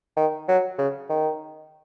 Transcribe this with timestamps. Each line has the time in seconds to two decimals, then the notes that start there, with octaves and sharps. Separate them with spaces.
0.17 D#3
0.48 F#3
0.78 C#3
1.10 D#3